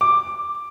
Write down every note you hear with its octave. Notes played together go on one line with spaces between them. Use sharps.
D6